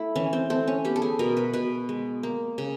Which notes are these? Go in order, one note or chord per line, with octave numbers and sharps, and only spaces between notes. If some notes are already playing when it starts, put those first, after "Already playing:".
Already playing: A3 E4
E3 C#4
C4
A3 C4
C#4
B3 G4
A4
G#4
B2 A#4
B4
B2 B4
G#3
A#3
C#3